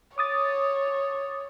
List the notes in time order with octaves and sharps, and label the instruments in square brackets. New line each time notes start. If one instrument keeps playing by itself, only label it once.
[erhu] C#5 [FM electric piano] D6 D#6 A6